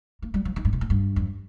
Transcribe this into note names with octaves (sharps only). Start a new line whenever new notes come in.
A#3
G3
F3
D#3
G2
C3
A#2
G2
F2